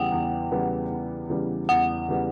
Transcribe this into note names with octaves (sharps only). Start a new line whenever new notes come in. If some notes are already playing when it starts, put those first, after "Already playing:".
Already playing: E2 C#3 E3 G3 B3 F#5 G5
E2
C#3 E3 G3 B3
E2
C#3 E3 G3 B3
E2 F#5
C#3 E3 G3 B3